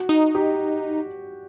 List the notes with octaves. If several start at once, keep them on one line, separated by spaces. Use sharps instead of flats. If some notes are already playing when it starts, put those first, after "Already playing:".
Already playing: F#4
D#4
G4